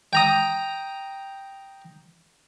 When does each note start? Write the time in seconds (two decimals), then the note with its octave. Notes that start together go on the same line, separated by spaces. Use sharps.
0.13 G5 A#5 D#6